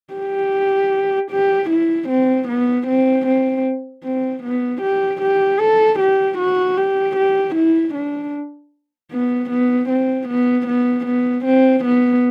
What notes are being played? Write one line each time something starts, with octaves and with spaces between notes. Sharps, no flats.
G4
G4
E4
C4
B3
C4
C4
C4
B3
G4
G4
A4
G4
F#4
G4
G4
E4
D4
B3
B3
C4
B3
B3
B3
C4
B3